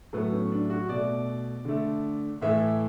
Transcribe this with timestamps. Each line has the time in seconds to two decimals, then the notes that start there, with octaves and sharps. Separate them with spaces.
0.13 A2 F#3 A3 B3
0.32 C#4
0.52 D4
0.70 F#4
0.89 B2 A3 D5
1.65 D3 A3
2.41 A2 E3 A3 E5